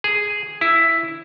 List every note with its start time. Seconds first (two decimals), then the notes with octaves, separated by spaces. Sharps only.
0.04 G#4
0.61 E4